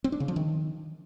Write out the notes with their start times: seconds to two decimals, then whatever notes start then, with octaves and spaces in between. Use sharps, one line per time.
0.04 C4
0.12 D4
0.20 C#3
0.28 F3
0.36 D#3